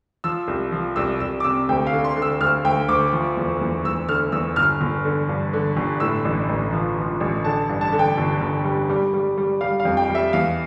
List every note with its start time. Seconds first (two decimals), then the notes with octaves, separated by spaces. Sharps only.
0.24 F3 E6
0.48 C2
0.72 F3
0.96 C2 E6
1.20 C2 E6
1.40 D6
1.44 C3 E6
1.69 D2 G5
1.87 F5
1.93 D3
2.04 C6
2.16 D3
2.22 E6
2.40 D2 F6
2.64 D2 G5
2.88 D2 D6
3.13 F3
3.37 E2
3.61 E2
3.85 E2 E6
4.09 D3 F6
4.32 E2 E6
4.56 G1 F6
4.81 G1
5.05 D3
5.29 G2
5.53 D3
5.77 G1
6.00 A2 E6
6.25 A1
6.49 A1
6.73 F3
6.97 F3
7.20 A1
7.45 D3 A5
7.69 G2
7.81 A5
7.93 D3
7.99 G5
8.18 G1
8.41 G1
8.64 G3
8.89 G3
9.14 G3
9.38 G3
9.61 G3 F5
9.80 F5
9.85 F2
9.97 G5
10.10 G3
10.15 E5
10.33 E2 F5